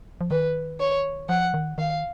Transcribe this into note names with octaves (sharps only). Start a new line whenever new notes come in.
F3
D#3 B4
C#5
F3 F#5
D#3
D#3 F5